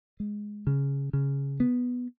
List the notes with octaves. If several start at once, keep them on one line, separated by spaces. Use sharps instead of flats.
G#3
C#3
C#3
B3